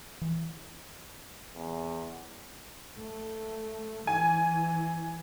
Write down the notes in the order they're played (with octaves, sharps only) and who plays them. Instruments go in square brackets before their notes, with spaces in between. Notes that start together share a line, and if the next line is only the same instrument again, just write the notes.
[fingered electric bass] E3
[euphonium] E2
[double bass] A3
[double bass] E3 [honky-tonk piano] G#5